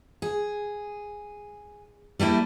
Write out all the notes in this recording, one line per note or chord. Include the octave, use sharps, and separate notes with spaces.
G#4
G3 A3 A#3 E4